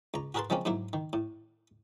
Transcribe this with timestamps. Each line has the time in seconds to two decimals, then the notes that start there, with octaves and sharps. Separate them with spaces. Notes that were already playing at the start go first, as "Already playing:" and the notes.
0.14 C#2 A#5
0.35 F#4 G#4 A#4 B4 A5 C6
0.50 F3 G#3 A#3 C4 C#4
0.65 G#2 F#3 A#3 E4
0.93 D#3
1.13 A2